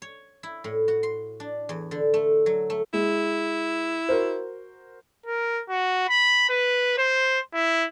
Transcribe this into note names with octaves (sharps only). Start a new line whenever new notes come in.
C#5
E4
A2
F#4
C6
D4
E2
D3
A3
F#3
A3
G#3 E4
F#4 A#4 C5
A#4
F#4
B5
B4
C5
E4